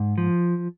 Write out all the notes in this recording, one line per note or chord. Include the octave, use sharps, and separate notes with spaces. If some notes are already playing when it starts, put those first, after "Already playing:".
Already playing: G#2
F3